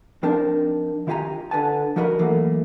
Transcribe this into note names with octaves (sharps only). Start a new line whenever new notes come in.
F3 C4 D4 D#4 A#4 A5
D#3 E4 F4 G4 G#5 A#5
D3 B4 G#5 A5
F3 D#4 F#4 A#4 D#5 B5
E3 F#3 A3 A#3